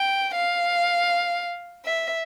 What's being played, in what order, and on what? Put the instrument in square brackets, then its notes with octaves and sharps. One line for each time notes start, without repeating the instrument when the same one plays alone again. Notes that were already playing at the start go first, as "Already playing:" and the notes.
Already playing: [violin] G5
F5
E5